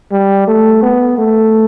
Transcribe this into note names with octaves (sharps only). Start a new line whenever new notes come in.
G3
A3
B3
A3